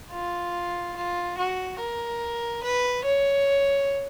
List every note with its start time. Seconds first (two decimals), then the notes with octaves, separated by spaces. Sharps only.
0.12 F4
0.96 F4
1.38 F#4
1.79 A#4
2.63 B4
3.04 C#5